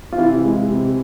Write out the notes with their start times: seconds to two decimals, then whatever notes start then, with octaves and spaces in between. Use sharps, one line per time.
0.12 F4
0.18 C3 E3 E4
0.44 G#3
0.70 C3